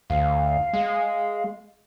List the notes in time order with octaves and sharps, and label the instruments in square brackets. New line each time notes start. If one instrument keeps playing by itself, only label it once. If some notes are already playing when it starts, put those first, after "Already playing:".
[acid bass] D2 [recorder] F5
[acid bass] G#3